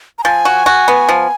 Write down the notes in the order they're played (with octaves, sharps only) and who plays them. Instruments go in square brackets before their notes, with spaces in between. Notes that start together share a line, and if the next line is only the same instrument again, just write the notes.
[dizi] A#5
[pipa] F3 [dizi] G#5
[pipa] F#4
F#4
B3
F3